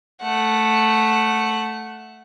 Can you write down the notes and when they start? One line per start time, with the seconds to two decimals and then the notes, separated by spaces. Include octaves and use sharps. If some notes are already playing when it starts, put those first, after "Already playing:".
0.23 A3 F#5